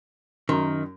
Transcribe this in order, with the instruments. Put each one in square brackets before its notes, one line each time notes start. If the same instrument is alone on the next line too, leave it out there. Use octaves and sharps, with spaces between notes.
[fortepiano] F#2 A#5 C6 [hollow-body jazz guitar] D#3